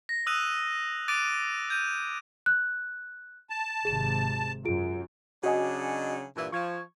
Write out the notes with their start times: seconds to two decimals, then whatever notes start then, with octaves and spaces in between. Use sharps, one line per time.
0.09 A#6
0.27 D#6 E6 F#6 D#7 F7
1.08 D6 F#6 A6 D7 D#7
1.70 G6 D#7
2.46 F#6
3.50 A5
3.85 G#1 C3 G#4 E7
4.65 F#2 F4 G#4 D7
5.44 C#3 F#3 D4 F#4 D#5 G#5
6.35 G2 A#2 E3
6.52 F3 C#6 G#6